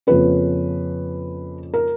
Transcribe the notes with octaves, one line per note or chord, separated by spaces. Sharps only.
F2 C#3 F3 A#3 C#4 B4
A#4